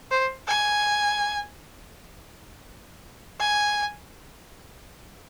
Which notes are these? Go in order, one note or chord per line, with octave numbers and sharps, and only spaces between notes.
C5
G#5
G#5